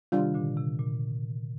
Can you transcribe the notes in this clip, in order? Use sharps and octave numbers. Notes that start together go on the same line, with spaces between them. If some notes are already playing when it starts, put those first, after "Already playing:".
C3 D#3 G3 D4 F4
A#2 D3
C3
A#2